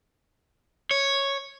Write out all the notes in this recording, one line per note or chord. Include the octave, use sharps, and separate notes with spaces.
C#5